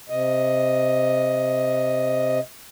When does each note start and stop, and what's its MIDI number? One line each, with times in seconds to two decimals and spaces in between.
0.10 2.39 48
0.10 2.39 75